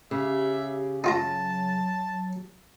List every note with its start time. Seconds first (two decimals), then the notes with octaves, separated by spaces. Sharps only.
0.11 C#3 G4 E5
1.04 F#3 D#4 F4 A5 A#5